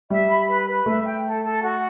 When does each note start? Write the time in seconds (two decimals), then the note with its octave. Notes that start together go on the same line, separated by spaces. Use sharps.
0.10 G3 E5
0.29 B5
0.48 B4
0.67 B4
0.86 A3 E5
1.05 G5
1.24 A4
1.43 A4
1.62 F#4